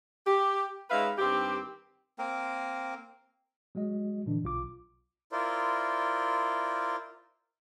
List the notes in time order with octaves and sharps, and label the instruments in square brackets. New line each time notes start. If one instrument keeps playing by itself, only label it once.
[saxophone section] G4
G#3 C#4 D#4 B4 E5 F5
G2 D#3 C4 G4
[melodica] A#3 C4 A#4
[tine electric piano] F#3 G#3 F#4 D#5
A#2 D3 E3 D4
B1 F4 D6
[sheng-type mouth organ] E4 F4 A#4 C5 D5